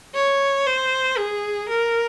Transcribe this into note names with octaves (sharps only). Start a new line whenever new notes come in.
C#5
C5
G#4
A#4